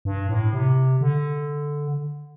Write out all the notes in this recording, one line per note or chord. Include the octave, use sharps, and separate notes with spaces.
G2
A2
C3
D3